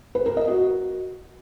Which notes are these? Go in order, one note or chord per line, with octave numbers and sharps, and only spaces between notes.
B4
A#4
D#5
F#4